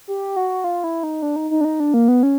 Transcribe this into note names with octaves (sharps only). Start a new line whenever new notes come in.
G4
F#4
F4
E4
D#4
D4
D#4
D#4
D4
D#4
D4
A#3
B3
C#4